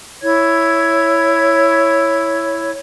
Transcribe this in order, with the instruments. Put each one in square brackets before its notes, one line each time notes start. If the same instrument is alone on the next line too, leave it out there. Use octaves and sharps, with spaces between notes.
[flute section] E4 C#5 G#6